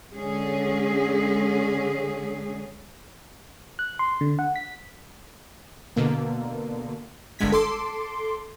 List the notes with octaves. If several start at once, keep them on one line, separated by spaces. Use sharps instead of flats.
D3 G#3 C#4 G#4
F#6
C6
D3
F#5
B6
B2 D3 A#3
G1 G2 D3 G#3 G#6 B6
A4 C6 D6